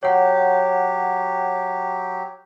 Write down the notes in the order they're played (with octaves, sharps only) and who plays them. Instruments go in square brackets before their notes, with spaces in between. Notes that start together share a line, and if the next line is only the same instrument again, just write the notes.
[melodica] F#3 G4 [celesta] C#5 F#5